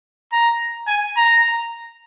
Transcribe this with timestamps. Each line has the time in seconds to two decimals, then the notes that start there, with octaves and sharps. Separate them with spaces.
0.32 A#5
0.88 G#5
1.16 A#5